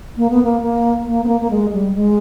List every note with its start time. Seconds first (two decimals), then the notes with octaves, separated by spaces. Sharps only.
0.17 A#3
0.30 B3
0.43 A#3
0.61 A#3
1.06 A#3
1.24 B3
1.28 A#3
1.41 A#3
1.50 G#3
1.73 G3
1.95 G#3